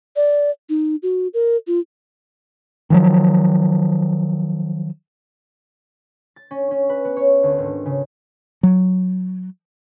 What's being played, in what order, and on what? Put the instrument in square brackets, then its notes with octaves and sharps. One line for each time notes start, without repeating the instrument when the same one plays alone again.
[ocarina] D5
D#4
F#4
A#4
F4
[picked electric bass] D#3 F3 F#3
[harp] A6
C#4
C#4
B4
B3
C#5
D2
G#1
C#3
[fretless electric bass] F#3